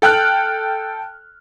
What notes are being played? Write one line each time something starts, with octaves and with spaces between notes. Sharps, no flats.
A4 G5 F6 F#6